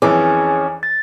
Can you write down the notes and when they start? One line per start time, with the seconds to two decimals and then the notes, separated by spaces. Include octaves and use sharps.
0.02 F2 E3 C#4 G#4 D6
0.83 A6